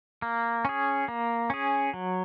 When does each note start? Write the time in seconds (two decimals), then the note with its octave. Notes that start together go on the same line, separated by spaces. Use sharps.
0.22 A#3
0.65 C#4 G#4
1.08 A#3
1.50 C#4 G#4
1.94 F#3